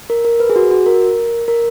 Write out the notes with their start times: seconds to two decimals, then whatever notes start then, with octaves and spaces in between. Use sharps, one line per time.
0.10 A#4
0.25 A#4
0.40 B4
0.50 G#4
0.56 F#4
0.71 F#4
0.86 A#4
1.48 A#4